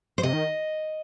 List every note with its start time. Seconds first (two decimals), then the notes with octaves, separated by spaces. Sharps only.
0.18 C5
0.23 C3 D#5
0.33 D#3